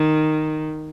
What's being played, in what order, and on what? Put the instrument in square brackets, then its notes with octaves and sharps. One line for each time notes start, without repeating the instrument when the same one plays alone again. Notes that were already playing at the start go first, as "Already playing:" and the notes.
Already playing: [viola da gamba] D#3